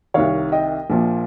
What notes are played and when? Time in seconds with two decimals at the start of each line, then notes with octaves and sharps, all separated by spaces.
0.14 C2 C3 D#3 C#5 F5
0.52 D#5 G5
0.90 A#1 A#2 F3